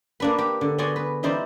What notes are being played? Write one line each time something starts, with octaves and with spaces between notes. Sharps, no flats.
A#3 D4 B4
G4
D3
B3 F#4 G#4 D5 G#5 C6
B4
E3 G3 D#4 E4 C5 D5